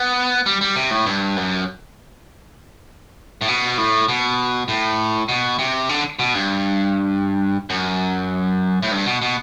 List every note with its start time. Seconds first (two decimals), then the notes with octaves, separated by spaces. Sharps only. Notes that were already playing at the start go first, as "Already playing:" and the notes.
Already playing: B3
0.46 G3
0.61 G3
0.76 C3
0.91 A2
1.06 G2
1.36 F#2
3.41 A2
3.48 B2
3.78 A2
4.09 B2
4.68 A2
5.29 B2
5.59 C3
5.89 D3
6.19 B2
6.35 G2
7.70 F#2
8.83 A2
8.91 G2
9.06 B2
9.22 B2